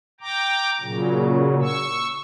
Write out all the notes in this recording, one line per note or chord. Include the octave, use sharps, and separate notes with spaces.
G5 A#5 D6
A#2 C#3 F#3
C#6 E6